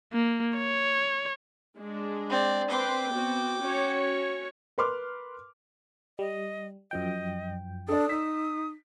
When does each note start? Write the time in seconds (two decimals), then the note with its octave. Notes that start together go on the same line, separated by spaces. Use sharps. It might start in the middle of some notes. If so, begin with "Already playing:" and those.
0.13 A#3
0.57 C#5
1.77 G#3 D4
2.30 C4 D5
2.70 C4 B4 G5 C6 D6
3.10 B3 C4 F#4
3.61 C#4 F#4 C#5
4.78 A#4 B4 C6 D6 F6
6.19 G3 D#5
6.91 F#2 F3 D#5 G5
7.88 D4 A4 D5 D#6
8.09 D#4 E6 B6